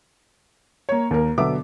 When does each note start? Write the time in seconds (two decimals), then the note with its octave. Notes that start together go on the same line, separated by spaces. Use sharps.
0.89 A#3 C#5
1.11 D#2 A#4
1.38 B2 D3 F#3 B3 E5 D6